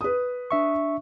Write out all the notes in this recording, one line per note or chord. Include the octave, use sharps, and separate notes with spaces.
B4 D#6
D4 E5 C#6